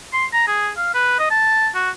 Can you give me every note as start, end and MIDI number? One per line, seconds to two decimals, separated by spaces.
0.13 0.26 84
0.33 0.46 82
0.48 0.70 68
0.77 0.90 77
0.94 1.17 71
1.19 1.29 75
1.31 1.69 81
1.75 1.90 66